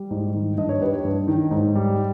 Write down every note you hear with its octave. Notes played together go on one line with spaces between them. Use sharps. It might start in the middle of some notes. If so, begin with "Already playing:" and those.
Already playing: G3
G#2
D#3
G2 D#5
C#5
G3 B4
C#5
G2
D#3
G#2
G3